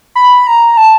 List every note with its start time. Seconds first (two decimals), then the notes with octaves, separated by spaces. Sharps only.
0.15 B5
0.47 A#5
0.77 A5